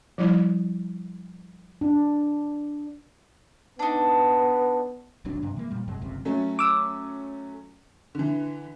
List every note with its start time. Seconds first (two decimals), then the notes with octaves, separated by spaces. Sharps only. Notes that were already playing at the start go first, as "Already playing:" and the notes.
0.18 F3 G3 E4
1.81 D4
3.79 B3 D4 D#4
5.25 E1 D#2 F#3 D4
5.43 G2 C3
5.56 E3 G#3 A#3
5.71 F2 A#2 G3
5.87 F#2 C3 F#3 G#3
6.01 F#1 C#2 F#2 C3
6.25 F#3 A3 C#4
6.59 D6 E6
8.15 D3 E3